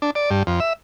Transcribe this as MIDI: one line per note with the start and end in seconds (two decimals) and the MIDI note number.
0.02 0.11 62
0.15 0.30 74
0.30 0.43 43
0.47 0.60 41
0.60 0.73 76